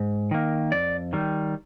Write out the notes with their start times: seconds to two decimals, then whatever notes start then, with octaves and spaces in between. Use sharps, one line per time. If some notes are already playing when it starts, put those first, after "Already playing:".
Already playing: G#2
0.31 D#3 A#3
0.72 F2 D5
1.13 D#3 G3